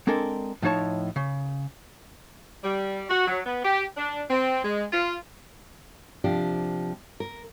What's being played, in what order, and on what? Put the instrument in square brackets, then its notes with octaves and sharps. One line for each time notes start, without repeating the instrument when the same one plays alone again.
[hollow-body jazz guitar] G#3 C4 D4 A4 A#4
A2 F3 D#4 C#5 A5
C#3
[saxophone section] G3
F#4
F#3
B3
G4
D4
C4
G#3
F4
[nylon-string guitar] C3 F3 D4 G4
A#4